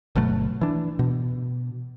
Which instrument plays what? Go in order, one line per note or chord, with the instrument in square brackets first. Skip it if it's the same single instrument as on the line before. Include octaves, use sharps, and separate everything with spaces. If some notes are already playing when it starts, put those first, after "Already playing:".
[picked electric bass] G1 B2 F#3 A3
E3 D4
B2